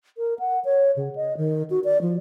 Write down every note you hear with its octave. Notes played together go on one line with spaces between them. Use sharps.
A#4
F#5
C#5
C#3
D#5
D#3
F#4
D5
F3